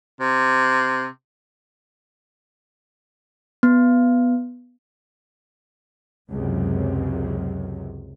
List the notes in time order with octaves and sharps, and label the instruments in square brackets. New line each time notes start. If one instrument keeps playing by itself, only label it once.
[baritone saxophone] C3
[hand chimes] B3
[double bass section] C#2 F#2 C3